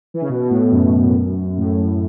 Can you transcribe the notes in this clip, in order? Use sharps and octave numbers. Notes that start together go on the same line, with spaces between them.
E3
C#3
B2
B2
A2
F#2
A2